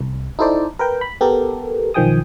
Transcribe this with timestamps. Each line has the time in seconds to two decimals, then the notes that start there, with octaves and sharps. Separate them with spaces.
0.01 C2
0.39 D#4 E4 A4 C5 D5
0.79 A#4 B4 G5
1.01 B5
1.21 B3 G4 A4 A#4
1.94 B1 D#3 F3 G5 G#5 D#6